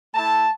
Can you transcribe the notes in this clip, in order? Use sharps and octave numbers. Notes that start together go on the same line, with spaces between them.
A3 E4 A5